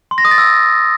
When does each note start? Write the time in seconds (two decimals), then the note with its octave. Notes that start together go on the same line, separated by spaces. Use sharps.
0.11 C6
0.18 A#6
0.25 D#6
0.31 A6
0.38 E6